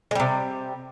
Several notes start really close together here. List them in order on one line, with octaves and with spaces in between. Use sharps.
G#3 G3 C3